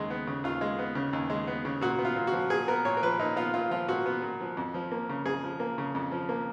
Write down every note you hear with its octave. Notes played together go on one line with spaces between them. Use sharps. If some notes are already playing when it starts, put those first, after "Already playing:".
Already playing: D#2 C#3 G#3
B3
C#3
D#2 F4
G#3
B3
C#3
D#2
G#3
B3
C#3
A#2 F#4
B3
F4
A#2
F#4
F3
A#2 G#4
B3 A#4
A#2 C#5
A#4
F3 B4
A#2 D#4
B3 F4
A#2 F4
F3 F4
A#2 F#4
B3
A#2
F3
F2
F3
A#3
C#3
F2 G#4
F3
A#3
C#3
F2
F3
A#3